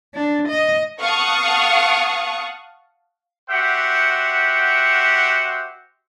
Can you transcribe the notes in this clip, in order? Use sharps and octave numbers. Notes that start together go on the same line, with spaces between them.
D4
D#5
F5 F#5 A5 C#6 D#6
F#4 G4 C5 E5 F#5 G5